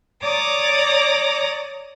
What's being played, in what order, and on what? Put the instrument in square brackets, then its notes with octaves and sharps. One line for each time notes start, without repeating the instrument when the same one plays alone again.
[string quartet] C#5 D5 A#5 D6 D#6